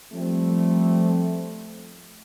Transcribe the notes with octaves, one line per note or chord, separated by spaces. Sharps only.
F3 G3 A3 C4